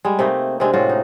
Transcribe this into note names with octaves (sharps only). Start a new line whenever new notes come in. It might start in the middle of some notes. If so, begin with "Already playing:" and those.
G3 G#3
C3 A3 A#3 D#4
C3 G#3 C4 D4
A2 G#3 F4 F#4
D#4